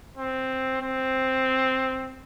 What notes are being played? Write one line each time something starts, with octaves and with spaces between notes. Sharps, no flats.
C4
C4